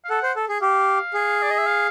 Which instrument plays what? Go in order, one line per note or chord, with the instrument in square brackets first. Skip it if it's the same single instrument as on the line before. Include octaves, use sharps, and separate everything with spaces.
[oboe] F5
[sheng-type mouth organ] A4 [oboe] F#5
[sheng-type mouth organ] C5
A4
G#4
[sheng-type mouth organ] G4 [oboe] F5
[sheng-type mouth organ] G#4
[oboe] D5
D#5
E5
F5